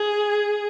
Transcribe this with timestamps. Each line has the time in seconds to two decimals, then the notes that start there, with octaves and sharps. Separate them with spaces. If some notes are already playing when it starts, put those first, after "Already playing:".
Already playing: G#4